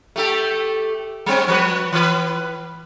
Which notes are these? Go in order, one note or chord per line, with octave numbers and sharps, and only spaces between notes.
A3 G4 A4
G3 C4 C#4
F3 B4
E3 B4